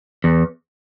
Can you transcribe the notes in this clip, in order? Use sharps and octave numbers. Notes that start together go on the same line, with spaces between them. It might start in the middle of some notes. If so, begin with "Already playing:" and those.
E2